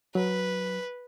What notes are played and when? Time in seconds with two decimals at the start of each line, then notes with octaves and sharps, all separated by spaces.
0.15 F#3 B4